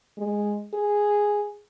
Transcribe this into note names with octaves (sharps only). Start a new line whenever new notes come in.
G#3
G#4